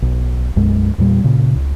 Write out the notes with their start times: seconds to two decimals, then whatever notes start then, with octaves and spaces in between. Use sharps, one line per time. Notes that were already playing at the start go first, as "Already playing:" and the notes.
0.02 B1
0.56 B1 F#2 G#3
0.98 E2 A#2 G3
1.24 A#2 C#3
1.56 C#2